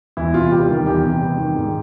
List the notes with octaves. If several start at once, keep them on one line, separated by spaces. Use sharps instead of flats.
E2 E4
C3 F4
G3 G4
D#3
E2 G4
C3
G3
D#3
G#2